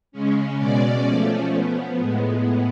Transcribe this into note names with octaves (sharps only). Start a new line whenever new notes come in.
C#3 G#3 C#4
B2 G#3 C#4 D5
F3 A3 C#4
F3 B3
A2 G#3 B3